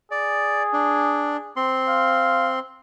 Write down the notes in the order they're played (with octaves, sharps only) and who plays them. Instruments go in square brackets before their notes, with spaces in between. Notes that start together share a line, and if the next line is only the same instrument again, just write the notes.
[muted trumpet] G#4 [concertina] D5
[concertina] D4
C4 C6
[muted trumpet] F5